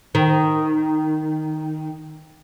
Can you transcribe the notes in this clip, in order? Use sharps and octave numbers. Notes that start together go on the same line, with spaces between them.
D#3